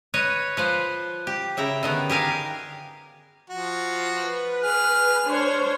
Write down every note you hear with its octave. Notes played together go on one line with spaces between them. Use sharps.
B4 C#5 D#5
F3 B4 C5
G4
C#3 E4 G5 A#5
D3 D#3 B3
G4 G#4 A#4 F5
F3 F#4
B4
G#4 F6
D4 C5 C#5